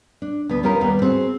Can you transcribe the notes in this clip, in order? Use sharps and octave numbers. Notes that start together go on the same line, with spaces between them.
D4
D2 B3
B3 C#4 F4 G4 A#4
D#2 G3 B3
C4 F#4 G#4 C5